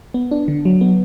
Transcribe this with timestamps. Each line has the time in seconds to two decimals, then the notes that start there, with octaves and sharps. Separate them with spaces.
0.14 B3
0.31 D4
0.48 D3
0.65 F#3
0.81 B3